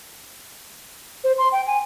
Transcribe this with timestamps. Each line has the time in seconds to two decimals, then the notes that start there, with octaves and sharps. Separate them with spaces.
1.24 C5
1.38 C6
1.52 G5
1.67 G#5